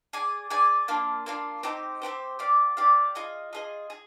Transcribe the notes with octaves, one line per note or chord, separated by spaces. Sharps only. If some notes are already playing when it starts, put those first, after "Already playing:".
G#4 D5 G#5
G#4 D5 G#5
A#3 D4 F4
A#3 D4 F4
C4 D#4 G4 C5
C4 D#4 G4 C5
G4 D5 F5
G4 D5 F5
F4 G#4 D#5
F4 G#4 D#5
G#4